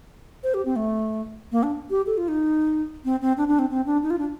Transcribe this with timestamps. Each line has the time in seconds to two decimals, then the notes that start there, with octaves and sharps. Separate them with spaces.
0.43 C5
0.54 G4
0.65 C4
0.76 A3
1.52 A#3
1.63 D4
1.90 G4
2.06 A4
2.17 F4
2.28 D#4
3.05 C4
3.21 C4
3.37 D4
3.48 D4
3.59 C4
3.70 C4
3.86 D4
4.03 D#4
4.10 F4
4.19 D4